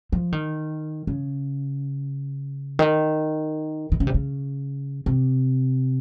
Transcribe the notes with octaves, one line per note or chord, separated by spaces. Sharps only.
F3
D#3
C#3
D#3
D#3
C#3
C3
C#3
C3